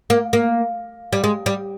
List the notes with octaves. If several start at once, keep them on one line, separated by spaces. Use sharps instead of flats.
A#3
A#3
G3
G#3
G3